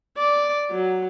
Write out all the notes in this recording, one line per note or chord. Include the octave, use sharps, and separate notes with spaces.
D5
F#3